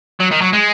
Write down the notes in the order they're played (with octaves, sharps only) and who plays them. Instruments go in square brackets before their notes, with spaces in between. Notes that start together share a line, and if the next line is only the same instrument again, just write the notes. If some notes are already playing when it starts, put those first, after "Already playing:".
[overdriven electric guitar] F#3
D#3
F#3
G#3